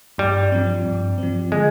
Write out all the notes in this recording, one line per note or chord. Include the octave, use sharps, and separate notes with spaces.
G2 G3
F3 C4
G2
F3 C4
D3 G#3